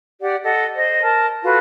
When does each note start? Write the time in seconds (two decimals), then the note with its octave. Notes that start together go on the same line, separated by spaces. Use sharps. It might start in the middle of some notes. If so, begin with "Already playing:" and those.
0.21 G4 D5 F#5
0.44 A4 D#5 F#5
0.76 C5 D#5
1.01 A#4 A5
1.42 F4 F#4 A4 B4